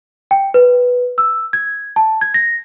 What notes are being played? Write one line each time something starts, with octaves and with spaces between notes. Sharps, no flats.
G5
B4
E6
G#6
A5
G#6
A#6